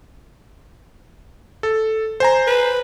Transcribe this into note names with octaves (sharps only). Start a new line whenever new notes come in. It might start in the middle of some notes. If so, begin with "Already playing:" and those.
A4
C5 G#5 A#5
B4